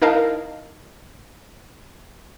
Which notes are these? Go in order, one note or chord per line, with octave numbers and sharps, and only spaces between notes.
D#4 E4 A#4 D#5 F5 A5